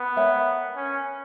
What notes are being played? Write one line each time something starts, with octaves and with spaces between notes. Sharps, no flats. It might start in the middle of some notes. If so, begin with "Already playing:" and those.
Already playing: B3
A#4 C#5 E5 G5
C#4